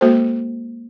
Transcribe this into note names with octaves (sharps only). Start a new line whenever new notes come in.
G#3 A#3 F#4 A4 C5